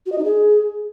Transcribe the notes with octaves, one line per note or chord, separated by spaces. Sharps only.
F#4
D#5
D#4
G#4